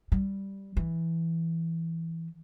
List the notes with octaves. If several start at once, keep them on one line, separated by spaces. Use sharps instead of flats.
G3
E3